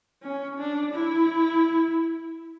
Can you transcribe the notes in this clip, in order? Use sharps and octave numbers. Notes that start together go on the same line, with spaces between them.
C#4
D4
E4